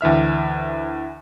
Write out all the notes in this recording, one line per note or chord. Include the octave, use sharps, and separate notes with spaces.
D2 E3 E5 F6